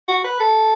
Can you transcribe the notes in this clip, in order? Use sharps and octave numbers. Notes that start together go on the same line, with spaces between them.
F#4
B4
A4